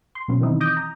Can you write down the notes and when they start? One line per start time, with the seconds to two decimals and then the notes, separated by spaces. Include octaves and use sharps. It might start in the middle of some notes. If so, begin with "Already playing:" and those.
0.15 C6
0.28 B2 F#3 B3 C#4
0.41 D#3 E3 C4 D#4 E4
0.60 D#5 D6 D#6 G6 A#6
0.77 A#5